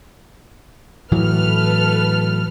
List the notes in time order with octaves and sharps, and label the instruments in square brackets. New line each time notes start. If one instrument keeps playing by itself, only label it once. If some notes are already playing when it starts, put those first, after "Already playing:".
[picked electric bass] A2 E3 F#3 [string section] A4 B4 F6